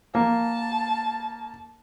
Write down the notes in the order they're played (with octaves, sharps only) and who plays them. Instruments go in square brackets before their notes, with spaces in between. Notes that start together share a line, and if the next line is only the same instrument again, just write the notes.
[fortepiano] A#3 [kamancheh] A5